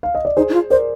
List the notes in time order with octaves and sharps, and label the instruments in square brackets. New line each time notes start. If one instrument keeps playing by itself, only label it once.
[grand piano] F5
D#5
D5
[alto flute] D#4 [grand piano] G#4 C5
[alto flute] D#4
F4
[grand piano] A#4 D5 [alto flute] C5